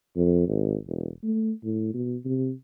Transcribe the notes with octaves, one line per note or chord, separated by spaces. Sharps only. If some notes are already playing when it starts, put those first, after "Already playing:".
F2
G#1
E1
A3
A2
B2
C3